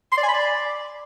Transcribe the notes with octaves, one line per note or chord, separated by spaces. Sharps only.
C6
D5
G#5
B5
D5